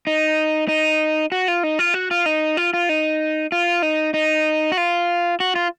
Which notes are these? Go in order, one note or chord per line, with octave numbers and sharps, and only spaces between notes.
D#4
D#4
F#4
F4
D#4
F4
F#4
F4
D#4
F4
F4
D#4
F4
D#4
D#4
F#4
F4
F#4
F4